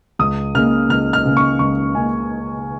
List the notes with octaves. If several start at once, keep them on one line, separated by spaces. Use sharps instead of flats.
C#2 D#6
C#3 A#3 F6
C#2 F6
F6
C#3 A#3
C#6
C#2 C#6
C#3 A#3 G#5